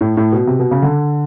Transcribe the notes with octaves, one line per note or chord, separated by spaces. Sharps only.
A2
A2
B2
C3
B2
C#3
D3